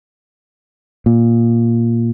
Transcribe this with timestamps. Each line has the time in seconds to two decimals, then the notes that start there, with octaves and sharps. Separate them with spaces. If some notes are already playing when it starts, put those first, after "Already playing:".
1.06 A#2